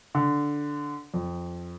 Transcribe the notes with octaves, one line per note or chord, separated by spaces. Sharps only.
D3
F2